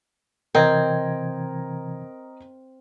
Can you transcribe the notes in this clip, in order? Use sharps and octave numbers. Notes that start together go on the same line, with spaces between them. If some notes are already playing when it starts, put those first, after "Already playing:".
C3 E3 C4 A#4 D#5 A#5 G#6